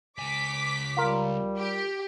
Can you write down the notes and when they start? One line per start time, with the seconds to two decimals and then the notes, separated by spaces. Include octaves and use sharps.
0.19 C#2 G#5 D6 B6
0.97 G3 F4 A#4
1.57 G4